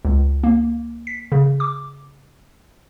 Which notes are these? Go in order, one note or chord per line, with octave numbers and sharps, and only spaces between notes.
C#2
A#3
B6
C#3
D6